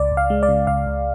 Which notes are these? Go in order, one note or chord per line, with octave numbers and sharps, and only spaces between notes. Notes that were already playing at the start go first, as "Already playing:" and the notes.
Already playing: C#2 D5
C#2
F5
G#3
D5
C#3
C#2 F5
C#2